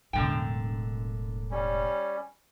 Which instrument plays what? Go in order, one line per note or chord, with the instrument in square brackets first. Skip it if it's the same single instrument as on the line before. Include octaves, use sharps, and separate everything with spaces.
[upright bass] E1 A2 [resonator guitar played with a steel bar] F#2 D3 G5
[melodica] G3 C#4